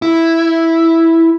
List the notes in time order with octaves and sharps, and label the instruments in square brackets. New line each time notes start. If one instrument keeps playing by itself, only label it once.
[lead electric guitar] E4